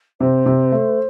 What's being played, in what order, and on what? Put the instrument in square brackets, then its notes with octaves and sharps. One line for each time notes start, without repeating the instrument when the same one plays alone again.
[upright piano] C3 [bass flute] C5
[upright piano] C3
A3